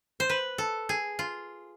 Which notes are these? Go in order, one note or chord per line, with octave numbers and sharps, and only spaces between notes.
C5
B4
A4
G#4
F4